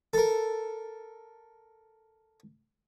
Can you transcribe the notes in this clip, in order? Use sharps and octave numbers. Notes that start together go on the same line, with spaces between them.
A4 A#4